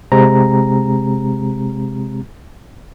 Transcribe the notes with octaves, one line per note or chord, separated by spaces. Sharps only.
C3 G#3 C4 G4 A#5